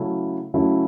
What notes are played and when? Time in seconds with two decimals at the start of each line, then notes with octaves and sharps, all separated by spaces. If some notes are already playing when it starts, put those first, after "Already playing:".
Already playing: C#3 F#3 A3 C#4 E4
0.54 C#3 F#3 A3 C#4 E4